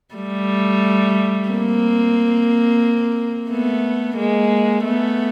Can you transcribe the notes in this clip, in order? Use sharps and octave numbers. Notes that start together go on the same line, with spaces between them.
G3 A3
A#3 C4
A3 B3
G#3 A#3
A3 B3